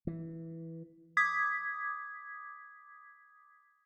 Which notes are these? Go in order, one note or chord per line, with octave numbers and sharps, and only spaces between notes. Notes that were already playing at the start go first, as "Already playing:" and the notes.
E3
D6 D#6 G#6 B6